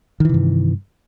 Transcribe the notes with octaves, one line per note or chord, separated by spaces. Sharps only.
G2 C3 D#3 E3